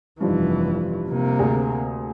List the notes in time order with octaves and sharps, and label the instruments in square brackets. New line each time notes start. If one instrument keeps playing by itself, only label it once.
[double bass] F1 E3 [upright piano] G2 F3 D#4
[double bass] C3 A#3
[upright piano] D2 G#4 A#5